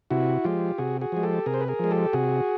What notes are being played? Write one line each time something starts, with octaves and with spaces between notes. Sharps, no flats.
C3 E4 F#4
F3 G#3 F4 G4
C3 F#4 G#4
F#4 G#4
F3 G#3
G4 A4
C3 G#4 A#4
C5
B4
G#4 A#4
F3 G#3
G4 A4
C3 F#4 G#4